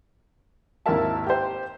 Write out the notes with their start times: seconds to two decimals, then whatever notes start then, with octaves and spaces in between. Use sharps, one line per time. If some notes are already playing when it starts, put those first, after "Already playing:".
0.86 G#1 D#2 E4 A#4 E5 A5
1.27 G4 C5